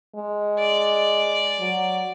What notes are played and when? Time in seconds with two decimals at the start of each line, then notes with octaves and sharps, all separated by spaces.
0.15 G#3
0.59 D5
1.60 F#3